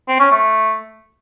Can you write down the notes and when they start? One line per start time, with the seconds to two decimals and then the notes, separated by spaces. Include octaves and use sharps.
0.08 C4
0.20 C#4
0.31 A3